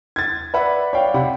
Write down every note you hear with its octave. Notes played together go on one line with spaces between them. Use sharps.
G#6 A6
B4 D5 E5 F#5 B5
C#5 D5 F5 G5
C3 F#5 B5